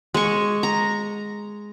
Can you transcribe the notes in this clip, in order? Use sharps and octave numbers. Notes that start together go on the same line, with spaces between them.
G#3 C#6
A#5